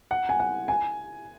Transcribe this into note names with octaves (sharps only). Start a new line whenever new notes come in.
F#5
G#5
F#5
G#5